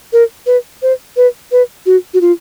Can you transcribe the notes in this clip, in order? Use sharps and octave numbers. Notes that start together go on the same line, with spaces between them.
A#4
B4
C5
B4
B4
F#4
F#4
F4